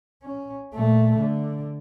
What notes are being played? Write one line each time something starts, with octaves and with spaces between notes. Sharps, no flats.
C#4
A#2 A3
D3